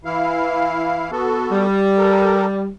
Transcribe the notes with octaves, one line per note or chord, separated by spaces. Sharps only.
E3 E4 F5
B3 F#4 A4
G3
A4 A#4